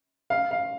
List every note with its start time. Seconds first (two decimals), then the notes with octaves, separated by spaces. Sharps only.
0.30 F5
0.51 F5